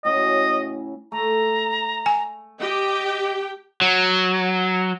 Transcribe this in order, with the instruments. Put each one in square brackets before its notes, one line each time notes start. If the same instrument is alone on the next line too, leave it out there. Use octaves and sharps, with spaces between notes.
[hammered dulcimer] A2 C#3 F#4 [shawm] D#5
[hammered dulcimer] A3 [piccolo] A#5
[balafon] G#5
[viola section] G4 G5 [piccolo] D#5
[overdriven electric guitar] F#3